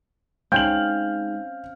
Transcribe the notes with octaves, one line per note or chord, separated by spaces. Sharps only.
G#3 C4 C#4 D#4 F5 G6 F#7